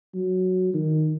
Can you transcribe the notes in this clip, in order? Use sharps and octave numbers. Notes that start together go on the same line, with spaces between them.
F#3
D#3